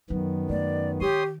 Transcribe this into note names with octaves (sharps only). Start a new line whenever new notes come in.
F#2 D#3 F#3 B3
A3 D5
D#3 G4 C#5 C6 D#6